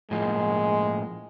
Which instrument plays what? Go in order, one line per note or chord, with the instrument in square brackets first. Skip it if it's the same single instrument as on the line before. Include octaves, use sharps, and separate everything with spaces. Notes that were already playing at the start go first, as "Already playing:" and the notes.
[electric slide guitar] A2 F3 A#3 [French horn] G#3